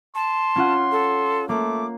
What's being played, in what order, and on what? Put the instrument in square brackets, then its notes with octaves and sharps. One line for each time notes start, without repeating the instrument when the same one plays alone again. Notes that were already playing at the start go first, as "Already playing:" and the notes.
[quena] A5 [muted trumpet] C6
[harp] C#4 F4 F#5
[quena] A4
[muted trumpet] A3 [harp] A#3 [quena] D6